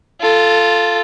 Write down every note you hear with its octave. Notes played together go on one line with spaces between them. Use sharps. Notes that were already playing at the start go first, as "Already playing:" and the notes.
F4 A4